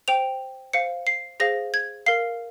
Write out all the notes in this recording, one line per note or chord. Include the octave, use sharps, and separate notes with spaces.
C5 G5 F7
C5 F5 C#7
C7
G#4 C5 F5 A#6
G#6
A#4 F5 C7